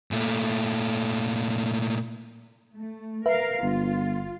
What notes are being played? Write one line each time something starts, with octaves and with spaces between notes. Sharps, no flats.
A#2 A3
A3
A#4 B4 E5 F5
G1 F4